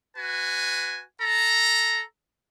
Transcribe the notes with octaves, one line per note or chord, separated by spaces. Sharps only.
F#4 B4 G#5
A4 A#5